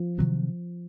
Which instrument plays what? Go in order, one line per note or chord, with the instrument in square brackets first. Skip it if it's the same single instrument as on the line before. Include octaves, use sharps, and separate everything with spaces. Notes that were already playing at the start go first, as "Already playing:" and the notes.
Already playing: [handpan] F3
[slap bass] C3 D#3 F#3 C4